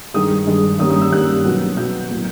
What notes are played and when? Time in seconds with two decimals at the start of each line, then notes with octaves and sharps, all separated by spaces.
0.14 G2 D#3 G#3 D#6
0.47 G2 D#3 G#3
0.79 G2 D#3 G3 A#3 C#4 D#6
0.90 D#6
1.01 E6
1.11 G2 D#3 G3 A#3 C#4 F#6
1.45 B2 F#3 B3
1.77 B2 F#3 B3 G6
2.10 A2 F#3 A#3